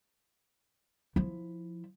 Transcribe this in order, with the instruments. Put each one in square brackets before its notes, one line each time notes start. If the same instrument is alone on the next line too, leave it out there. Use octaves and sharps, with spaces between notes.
[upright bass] F3 E4